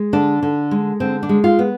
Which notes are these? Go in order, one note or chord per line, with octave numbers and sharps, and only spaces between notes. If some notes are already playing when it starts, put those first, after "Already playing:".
Already playing: G#3
D3 D4
D3
G#3
D3 C4
D4
G#3
F4
B3